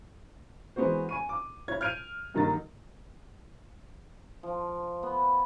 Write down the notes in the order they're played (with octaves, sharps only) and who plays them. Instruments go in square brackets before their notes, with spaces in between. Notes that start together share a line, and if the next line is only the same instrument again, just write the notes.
[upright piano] E3 G#3 B3 C4 F#4 C5
G#5 C#6 D#7
D6
E4 C#5 G#6
F6 G6 G#6 D7 D#7
G2 D#3 F#3 A#3 D#4 A6
[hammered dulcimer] F3
B3